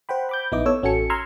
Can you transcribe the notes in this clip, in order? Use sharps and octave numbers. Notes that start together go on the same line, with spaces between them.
C5 F#5 G5 B5
B5 D6 G6
A#1 B3 D#4 E4 D#5 D6
B3 A4 C#5 E6
A1 C#4 F#4 A4 G#5 C#7
A#5 C6 E6 F6 G#6